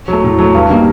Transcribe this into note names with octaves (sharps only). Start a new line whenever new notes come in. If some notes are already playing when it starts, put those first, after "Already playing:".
F#3 A3
A2
F#3 A3
G2
D#3 G3 A#3